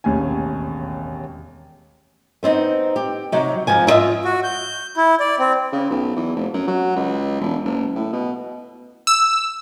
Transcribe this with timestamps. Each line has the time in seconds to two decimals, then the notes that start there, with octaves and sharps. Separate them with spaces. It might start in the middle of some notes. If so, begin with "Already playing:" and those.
0.04 E1 A1 D#2 C3 C#4 G#5
2.43 B3 C4 D4 D#4
2.96 G4
3.32 C3 F#3 D#4
3.67 F2 G#2 F3 G#5
3.87 E4 F4 D#5 E5
4.25 F#4
4.44 G6
4.97 E4
5.20 D5
5.39 C4
5.73 C#3
5.90 B1
6.16 E2
6.36 F1
6.54 F#2
6.68 F#3
6.96 C#2
7.41 E1
7.65 F#1
7.96 A2
8.13 B2
9.07 E6